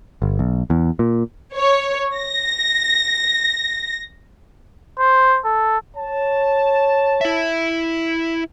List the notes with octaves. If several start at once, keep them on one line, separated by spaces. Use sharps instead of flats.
G1
B1
E2
A#2
C#5
A#6
C5
A4
C#5 A5
E4 E5